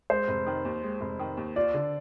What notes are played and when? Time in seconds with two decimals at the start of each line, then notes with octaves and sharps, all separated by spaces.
0.10 G#3 C5
0.28 F1
0.47 D#3
0.65 D#2
0.83 G#3
1.01 F1
1.19 D#3
1.37 D#2
1.56 F4 D5
1.74 D3